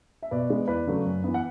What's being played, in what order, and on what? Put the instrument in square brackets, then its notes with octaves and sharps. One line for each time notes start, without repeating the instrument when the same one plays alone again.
[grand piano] E5
B2 B4 D5
G#3 B3
E2 B4 D5
C#3 F#3 A3
F#2
E3 B3
F#5